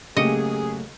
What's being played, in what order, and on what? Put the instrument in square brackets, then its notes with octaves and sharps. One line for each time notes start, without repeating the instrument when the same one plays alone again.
[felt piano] C#3 G4 C#7 [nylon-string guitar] F#3 A3 A#3 [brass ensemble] G#4 [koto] D#5